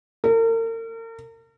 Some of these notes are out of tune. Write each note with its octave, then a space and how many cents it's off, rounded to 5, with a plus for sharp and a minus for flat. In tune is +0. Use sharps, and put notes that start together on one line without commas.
A#4 -40